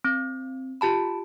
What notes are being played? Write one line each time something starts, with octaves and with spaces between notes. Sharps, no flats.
C4
F4 G4 A5 B5